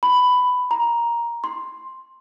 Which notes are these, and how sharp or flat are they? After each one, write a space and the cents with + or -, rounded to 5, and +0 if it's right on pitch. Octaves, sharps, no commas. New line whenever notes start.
B5 +10
A#5 +10
C6 +5